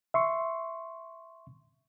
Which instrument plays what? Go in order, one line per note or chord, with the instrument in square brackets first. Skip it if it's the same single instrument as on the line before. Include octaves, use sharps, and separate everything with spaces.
[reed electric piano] E5 C6 C#6